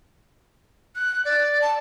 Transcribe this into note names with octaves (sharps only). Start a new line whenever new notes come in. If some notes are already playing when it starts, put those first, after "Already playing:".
F#6
D5
A5